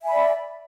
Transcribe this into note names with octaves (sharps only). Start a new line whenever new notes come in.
D5 E5 G#5 B5